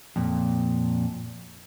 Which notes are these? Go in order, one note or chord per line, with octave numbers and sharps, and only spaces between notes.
F2 A#2